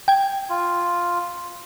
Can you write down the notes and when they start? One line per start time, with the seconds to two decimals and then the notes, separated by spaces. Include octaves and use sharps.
0.08 G5 G#6
0.50 F4